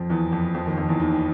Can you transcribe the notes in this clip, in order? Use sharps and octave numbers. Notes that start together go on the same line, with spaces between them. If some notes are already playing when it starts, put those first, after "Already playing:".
Already playing: F2 F3
E2 E3
F2 F3
F2 F3
D#2 D#3
F2 F3
E2 E3
D#2 D#3